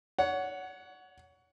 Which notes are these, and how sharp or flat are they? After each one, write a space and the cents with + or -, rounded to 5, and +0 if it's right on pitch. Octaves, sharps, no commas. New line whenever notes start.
C#5 +25 F#5 +0